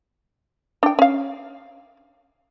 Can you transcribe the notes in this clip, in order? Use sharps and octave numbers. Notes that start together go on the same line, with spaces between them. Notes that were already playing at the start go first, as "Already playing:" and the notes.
D4 G5
C#4 F5